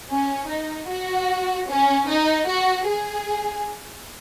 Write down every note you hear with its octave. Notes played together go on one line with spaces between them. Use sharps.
C#4
D#4
F#4
C#4
D#4
F#4
G#4